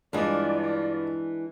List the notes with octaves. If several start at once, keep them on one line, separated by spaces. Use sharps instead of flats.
G2 E3 G#3 D4 F4 D5 D#5